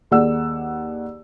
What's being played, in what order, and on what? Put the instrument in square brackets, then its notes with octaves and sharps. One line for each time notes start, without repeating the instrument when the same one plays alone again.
[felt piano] D#2 G#4 D5 F#5 E6